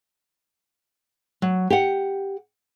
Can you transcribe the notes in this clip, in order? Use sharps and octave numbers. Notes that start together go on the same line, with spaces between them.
F#3
G4 F#5